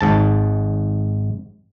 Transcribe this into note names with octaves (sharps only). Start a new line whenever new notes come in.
G#1 G#2 A5